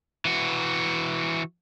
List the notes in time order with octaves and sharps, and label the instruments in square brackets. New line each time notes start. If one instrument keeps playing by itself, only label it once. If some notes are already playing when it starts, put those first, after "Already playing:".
[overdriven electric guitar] E3 F#4